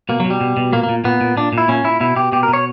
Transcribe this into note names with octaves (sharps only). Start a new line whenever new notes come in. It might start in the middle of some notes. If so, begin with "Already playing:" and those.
B2 A#3
B2 F#3
G3
B2
B2
A#2 A#3
A#3
A#2
A#2 B3
A#2
A#2 D4
A#2
E4
A#2 C#4
A#2 E4
B2 E4
B2 G4
B2 G4
A#4
B2
C#5